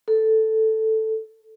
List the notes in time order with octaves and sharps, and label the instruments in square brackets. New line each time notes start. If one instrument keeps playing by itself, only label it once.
[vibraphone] A4